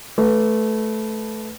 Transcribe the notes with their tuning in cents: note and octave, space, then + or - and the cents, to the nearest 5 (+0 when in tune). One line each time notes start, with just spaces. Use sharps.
A3 -15 B4 +0